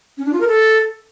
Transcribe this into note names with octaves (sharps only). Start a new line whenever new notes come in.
C#4
D4
F4
A#4
A4